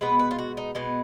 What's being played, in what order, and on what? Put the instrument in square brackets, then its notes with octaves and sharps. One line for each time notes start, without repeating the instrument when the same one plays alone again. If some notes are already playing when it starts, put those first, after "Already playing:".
[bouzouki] B2 G#3 B3 B4
B4
F4
F#4
D#4
B2 G#3 B3